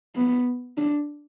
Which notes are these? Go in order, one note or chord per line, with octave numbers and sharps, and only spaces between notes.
B3
D4